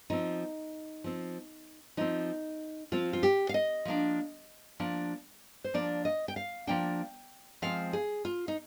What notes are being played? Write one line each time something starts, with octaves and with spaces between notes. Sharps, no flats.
F3 C4 D#4
F3 C4
F3 C4 D#4
F3 C4 F4
F4
G4
F5
D#5
F3 A#3 D4
F3 A#3 D4
C5
F3 A#3 D4 D5
D#5
G5
F5
F3 A#3 D4 G5
F3 G#3 C4 F5
G#4
F4
D#4